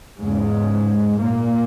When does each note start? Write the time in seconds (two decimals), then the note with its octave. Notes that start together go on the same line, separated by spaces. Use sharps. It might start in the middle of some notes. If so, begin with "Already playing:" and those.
0.20 E2 G#2 C#3 G#3
1.18 A#2 A#3